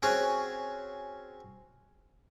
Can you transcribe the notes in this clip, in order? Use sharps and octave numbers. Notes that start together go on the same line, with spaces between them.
C4 C#4 F#4 G#4 C#5 F#5